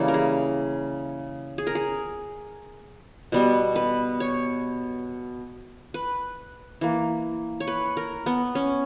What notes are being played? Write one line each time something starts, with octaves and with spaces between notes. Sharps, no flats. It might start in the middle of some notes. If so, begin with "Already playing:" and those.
Already playing: C#3 E3 G3 A#3
A#4
G#4
G#4
A#4
G#4
B2 G3 B3
B4
C#5
B4
E3 A#3
C#5
B4
A#4
B3
C#4